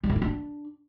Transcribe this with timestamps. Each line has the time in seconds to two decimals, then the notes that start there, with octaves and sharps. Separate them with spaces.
0.03 G3
0.10 D3
0.16 E4
0.22 D4